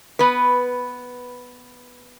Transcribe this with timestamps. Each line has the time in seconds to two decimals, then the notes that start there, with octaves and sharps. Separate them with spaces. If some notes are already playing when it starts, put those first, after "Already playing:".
0.19 B3 B4